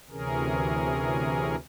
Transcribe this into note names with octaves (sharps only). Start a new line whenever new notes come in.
D2 C3 E3 C#4 G#4 A#4